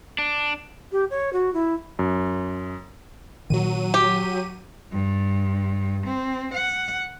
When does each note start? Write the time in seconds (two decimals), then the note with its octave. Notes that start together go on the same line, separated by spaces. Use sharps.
0.18 D4
0.92 G4
1.10 C#5
1.33 F#4
1.54 E4
1.99 F#2
3.50 A#2 D#3 F#3 D#7
3.94 G4
4.91 G2
6.06 C4
6.52 F#5